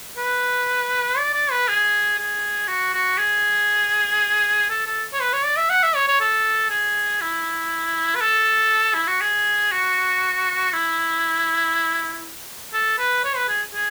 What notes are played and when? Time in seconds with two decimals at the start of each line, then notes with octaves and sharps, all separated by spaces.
0.17 B4
1.18 D5
1.34 D5
1.51 B4
1.68 G#4
2.19 G#4
2.68 F#4
2.94 F#4
3.18 G#4
4.70 A4
4.86 A4
5.13 C#5
5.20 B4
5.33 C#5
5.45 D5
5.57 E5
5.70 F#5
5.83 E5
5.96 C#5
6.08 C#5
6.21 A4
6.70 G#4
7.21 E4
8.15 B4
8.21 A4
8.94 E4
9.07 F#4
9.21 G#4
9.72 F#4
10.73 E4
12.73 A4
12.98 B4
13.24 C#5
13.36 B4
13.48 G#4
13.74 G#4